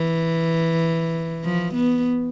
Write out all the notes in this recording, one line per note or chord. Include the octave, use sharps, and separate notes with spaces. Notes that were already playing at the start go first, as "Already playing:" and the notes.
Already playing: E3
F3
B3